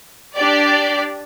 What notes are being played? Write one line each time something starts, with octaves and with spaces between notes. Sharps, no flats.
D4 G4 D5